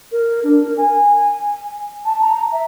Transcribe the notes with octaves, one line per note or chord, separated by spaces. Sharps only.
A#4
D4
A#4
G#5
A5
A#5
E5